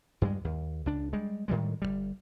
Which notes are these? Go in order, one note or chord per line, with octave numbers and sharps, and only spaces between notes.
G2 G3 G#3
D#2
C#2 D4
G3 G#3
A2 D#3 G3 G#3
G1 F2 G3